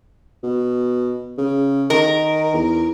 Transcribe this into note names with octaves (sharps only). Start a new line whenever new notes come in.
B2
C#3
D#3 A#4
E2